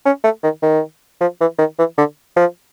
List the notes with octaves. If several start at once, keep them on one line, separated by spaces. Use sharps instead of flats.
C#4
A3
D#3
D#3
F3
E3
D#3
E3
D3
F3